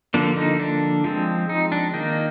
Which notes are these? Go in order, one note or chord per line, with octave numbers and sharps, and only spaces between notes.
D3 F3 A#3 D4
D#4
D4
F3 G#3 C4
D#4
D4
D#3 A#3 D#4